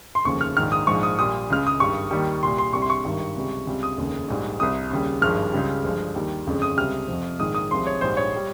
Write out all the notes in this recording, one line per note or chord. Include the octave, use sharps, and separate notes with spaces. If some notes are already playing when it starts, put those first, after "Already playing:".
C6
F1 D#2 C#3 F3 C#6
F6
A#1 G#2 D#3 F6
D#6
A#1 G#2 F3 G#3 C#6
D#6
A#1 A#2 G3 D#6
C#2 C#3 G#3 F6
D#6
G#1 G2 G3 C#6
D#2 D#3 G3
C2 A#2 G3 C6
C6
C2 C3 G3 C#6
C6
C#6
G#1 G2 D#3 G3
C#2 C3 G3
C#2 C3 G3
D#6
F1 D#2 C#3
A#1 G#2 G3
C2 C3 G3 D#6
D#2 C#3 G3
G#1 G2 F3 G#3 F6
C#2 C#3 G3
G1 G2 F3 G#3
D#2 D#3 G3
G1 F2 C#3 G#3
D#6
C#2 C3 G3 F6
F2 C3 F3
A#1 G#2 D#3 G#3 D#6
D#6
C2 C3 F3 G#3 C6
C#5
A#1 G#2 G3 C5
C#5
G3